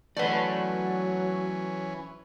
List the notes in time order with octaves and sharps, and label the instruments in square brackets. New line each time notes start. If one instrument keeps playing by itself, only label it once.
[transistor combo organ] E3 C#4 [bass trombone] F#3 [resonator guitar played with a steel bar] A3 B4 [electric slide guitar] D5 F#5